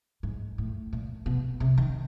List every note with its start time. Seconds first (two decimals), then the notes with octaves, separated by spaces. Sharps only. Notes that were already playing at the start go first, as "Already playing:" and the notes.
0.23 G#2
0.58 A2
0.93 A#2
1.26 B2
1.60 C3
1.78 D#3